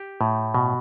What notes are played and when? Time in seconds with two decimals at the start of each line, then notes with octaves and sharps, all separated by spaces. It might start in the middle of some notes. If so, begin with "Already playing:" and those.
Already playing: G4
0.21 A2
0.54 B2